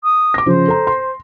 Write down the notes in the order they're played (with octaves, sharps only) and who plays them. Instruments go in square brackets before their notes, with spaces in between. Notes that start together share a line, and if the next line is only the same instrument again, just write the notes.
[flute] D#6
[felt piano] D6 A#6
[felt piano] C#3 F3 [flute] C5
[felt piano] A4 A#5
C6